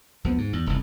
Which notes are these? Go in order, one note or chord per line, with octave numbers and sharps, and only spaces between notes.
D2 F3 B3
G#2
E2
F1 C2